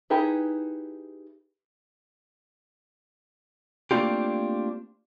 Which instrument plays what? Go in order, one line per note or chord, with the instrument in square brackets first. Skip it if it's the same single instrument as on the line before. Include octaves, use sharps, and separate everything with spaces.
[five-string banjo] D#4 E4 G4 G#4 B4
[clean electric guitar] A3 A#3 C4 D4 F4 G4